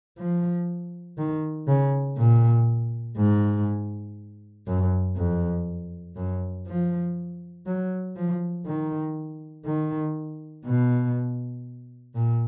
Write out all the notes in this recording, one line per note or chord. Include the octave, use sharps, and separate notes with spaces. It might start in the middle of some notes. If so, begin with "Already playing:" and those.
F3
D#3
C#3
A#2
G#2
F#2
F2
F#2
F3
F#3
F3
D#3
D#3
B2
A#2